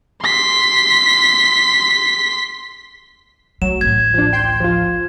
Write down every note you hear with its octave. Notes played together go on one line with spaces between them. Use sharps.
C6 B6
F#3 A3 E7
A1 D2 G#6
F3 D4
G5 C6 G6
F3 F4